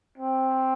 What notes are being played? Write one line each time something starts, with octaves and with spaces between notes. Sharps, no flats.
C4